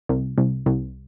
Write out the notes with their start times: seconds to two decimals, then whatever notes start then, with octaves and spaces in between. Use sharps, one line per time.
0.09 C2
0.38 C2
0.66 C2